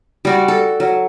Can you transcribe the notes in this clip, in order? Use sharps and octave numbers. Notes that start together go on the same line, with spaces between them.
G3 F#4 D5
A4
F#3